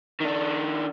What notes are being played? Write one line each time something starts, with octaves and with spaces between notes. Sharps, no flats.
D#3 D4